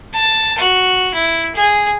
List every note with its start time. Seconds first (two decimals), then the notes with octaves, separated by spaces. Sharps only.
0.14 A5
0.58 F#4
1.14 E4
1.55 G#4